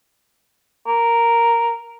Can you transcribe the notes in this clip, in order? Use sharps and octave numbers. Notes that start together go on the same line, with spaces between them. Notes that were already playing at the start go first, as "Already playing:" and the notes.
A#4